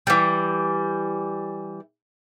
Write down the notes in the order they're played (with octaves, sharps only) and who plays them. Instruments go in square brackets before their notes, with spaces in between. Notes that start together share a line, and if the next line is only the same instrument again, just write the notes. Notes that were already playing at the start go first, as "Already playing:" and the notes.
[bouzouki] E3 G3